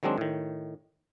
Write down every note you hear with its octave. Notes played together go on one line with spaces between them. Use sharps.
D#3 F#3 G#3 C4 D4
A2 D#3